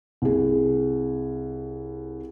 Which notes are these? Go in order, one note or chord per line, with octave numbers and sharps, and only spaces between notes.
C2 G#4